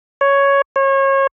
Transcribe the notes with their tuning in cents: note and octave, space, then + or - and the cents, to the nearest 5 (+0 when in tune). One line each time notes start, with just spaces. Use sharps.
C#5 +5
C#5 -30